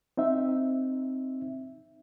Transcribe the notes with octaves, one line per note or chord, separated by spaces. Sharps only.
C4 D#4 E5